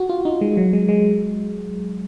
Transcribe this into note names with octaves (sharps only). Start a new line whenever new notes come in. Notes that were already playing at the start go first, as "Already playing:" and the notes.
Already playing: F#4
F4
D#4
G#3
F#3
G#3
G#3